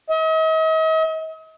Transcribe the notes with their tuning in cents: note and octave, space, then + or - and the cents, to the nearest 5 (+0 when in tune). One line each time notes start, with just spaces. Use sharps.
D#5 +45